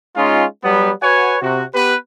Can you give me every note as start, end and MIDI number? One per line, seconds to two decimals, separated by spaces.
0.15 0.45 56
0.15 0.45 61
0.15 0.45 63
0.15 0.45 65
0.64 0.91 54
0.64 0.91 55
0.64 0.91 59
1.02 1.35 66
1.02 1.35 71
1.02 1.35 73
1.02 1.35 78
1.02 1.35 80
1.41 1.64 48
1.41 1.64 66
1.74 1.94 59
1.74 1.94 67
1.74 1.94 71